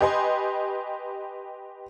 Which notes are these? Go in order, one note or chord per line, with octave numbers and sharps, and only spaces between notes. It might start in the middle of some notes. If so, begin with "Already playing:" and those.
G4 B4 D#5 G#5 C6